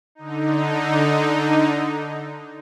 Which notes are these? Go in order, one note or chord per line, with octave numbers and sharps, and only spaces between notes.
D3 D#4